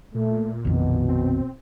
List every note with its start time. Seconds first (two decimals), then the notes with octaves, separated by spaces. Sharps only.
0.15 A#2 A3
0.65 A#1 F2 B2 D#3
1.09 C4